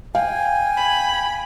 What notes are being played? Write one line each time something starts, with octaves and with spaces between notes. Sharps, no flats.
F5 G5 G#5
B5